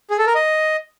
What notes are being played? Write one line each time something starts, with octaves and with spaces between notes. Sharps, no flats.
G#4
A4
A#4
D#5